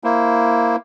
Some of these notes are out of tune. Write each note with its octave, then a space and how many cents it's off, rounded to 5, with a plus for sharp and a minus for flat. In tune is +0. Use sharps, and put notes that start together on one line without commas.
A#3 +0 E4 +0 C5 +0